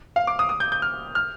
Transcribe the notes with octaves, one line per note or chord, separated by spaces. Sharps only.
F5
D6
D#6
D#6
G6
G6
F6
F6